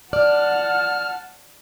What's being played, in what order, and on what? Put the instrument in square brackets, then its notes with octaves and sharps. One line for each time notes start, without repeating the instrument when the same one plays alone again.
[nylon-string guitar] D5 [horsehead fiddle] F#5 A5 [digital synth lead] F6